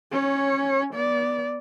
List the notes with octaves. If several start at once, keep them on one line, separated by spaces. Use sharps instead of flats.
C#4 C#5
B3 D5